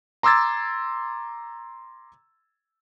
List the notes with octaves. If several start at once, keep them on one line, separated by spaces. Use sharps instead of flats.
A#5 C6 D6 E6 G#6 A6